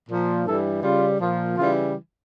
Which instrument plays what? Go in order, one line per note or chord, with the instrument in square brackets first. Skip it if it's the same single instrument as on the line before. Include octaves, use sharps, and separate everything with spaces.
[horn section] A#2 F3
G2 E3 G3 A4
C#3 G3 F4
A#2 F3
C#3 E3 G3 F4